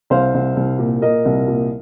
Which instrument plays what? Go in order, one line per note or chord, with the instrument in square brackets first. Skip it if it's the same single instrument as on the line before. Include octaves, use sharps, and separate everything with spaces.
[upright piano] C2 C5 F5
C2
C2
A#2
A#2 A#4 D#5
C2
A#2